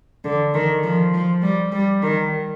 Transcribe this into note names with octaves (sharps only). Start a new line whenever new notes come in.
D3
D#3
F3
F3
G3
G3
D#3